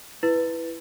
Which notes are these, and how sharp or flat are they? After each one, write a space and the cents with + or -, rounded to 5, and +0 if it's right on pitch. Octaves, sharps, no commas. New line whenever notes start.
E4 +0 B4 +0